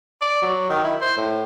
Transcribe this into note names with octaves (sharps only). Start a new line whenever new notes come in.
D5
F#3
D#3
E4
C5
A2